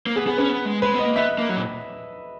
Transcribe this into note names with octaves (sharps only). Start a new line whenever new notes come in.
A#3
B3 G#4
B3 G#4
C#4 B4
B3
G#3
G#3 B4
B3 D#5
A#3
B3 E5
A#3
F#3
A#2